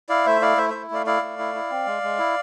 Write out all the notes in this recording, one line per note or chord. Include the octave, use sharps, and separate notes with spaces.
E4 D5 F5
A3 C5 E5
E4 D5 F5
A3 C5 E5
E4 C5 E5
A3 D5 F5
E4 D5 F5
A3
E4
E4
C4
G#3
G#3
E4